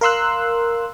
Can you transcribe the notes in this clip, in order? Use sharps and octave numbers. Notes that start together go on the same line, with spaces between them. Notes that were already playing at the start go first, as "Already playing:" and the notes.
A#4 F5 C6 E6 F#6